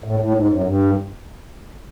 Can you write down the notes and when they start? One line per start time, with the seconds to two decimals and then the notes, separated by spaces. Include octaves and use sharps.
0.04 A2
0.20 A2
0.34 G#2
0.48 F#2
0.64 G2